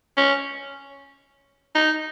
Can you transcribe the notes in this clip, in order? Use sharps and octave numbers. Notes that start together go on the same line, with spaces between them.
C#4
D#4